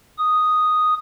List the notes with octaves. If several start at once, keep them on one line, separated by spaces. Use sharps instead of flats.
D#6